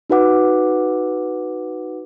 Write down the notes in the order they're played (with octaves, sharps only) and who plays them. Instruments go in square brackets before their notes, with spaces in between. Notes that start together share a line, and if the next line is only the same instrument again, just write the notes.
[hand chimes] D#4 F#4 B4 F#5 D6